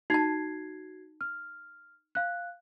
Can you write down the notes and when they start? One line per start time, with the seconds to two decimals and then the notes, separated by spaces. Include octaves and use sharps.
0.10 D#4 F#4 A5 G#6 C7
1.21 F6
2.15 F5 F#6